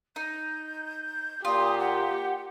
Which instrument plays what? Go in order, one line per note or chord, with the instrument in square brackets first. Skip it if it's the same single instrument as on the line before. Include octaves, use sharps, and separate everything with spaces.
[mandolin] D#4 [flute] G6
[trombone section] A#2 A#3 [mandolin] F4 [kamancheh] G4 [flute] D#6
[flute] F#5